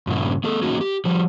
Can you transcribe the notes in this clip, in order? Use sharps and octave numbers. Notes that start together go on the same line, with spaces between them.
G2 A#2 C#3 E4
A#3 G#4 A4
A#3 C#4 D#4 F#4 G#4
G4
F3 G3